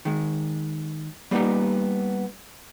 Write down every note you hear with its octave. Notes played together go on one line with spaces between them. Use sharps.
D#3 G#3
G3 A#3 B3 D4 D#4 G4